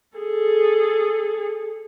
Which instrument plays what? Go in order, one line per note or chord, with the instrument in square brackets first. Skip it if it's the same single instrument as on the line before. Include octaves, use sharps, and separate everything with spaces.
[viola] G#4 A4